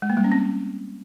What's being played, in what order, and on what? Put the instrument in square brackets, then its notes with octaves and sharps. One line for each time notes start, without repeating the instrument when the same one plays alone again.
[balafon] G#3
A#3
G3
C#4
C4